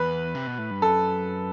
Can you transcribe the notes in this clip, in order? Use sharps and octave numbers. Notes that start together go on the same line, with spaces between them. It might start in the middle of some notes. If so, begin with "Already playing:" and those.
Already playing: E2 B4
C3
B2
A2
G2
F#2 A4